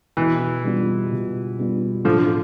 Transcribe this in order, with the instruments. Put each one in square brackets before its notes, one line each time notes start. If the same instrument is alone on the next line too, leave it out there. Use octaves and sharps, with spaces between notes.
[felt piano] B2 [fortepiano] E3
[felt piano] G3 B3 F4
B2
G3 B3 F4
[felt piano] A2 [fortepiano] D3 F3